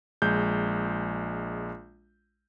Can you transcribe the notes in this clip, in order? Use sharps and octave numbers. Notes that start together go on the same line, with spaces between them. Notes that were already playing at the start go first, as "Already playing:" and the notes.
A#1 G#3 G6